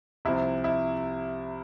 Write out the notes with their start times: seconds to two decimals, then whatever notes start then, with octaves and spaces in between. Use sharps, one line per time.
0.25 C2 C3 F3 E4
0.64 E4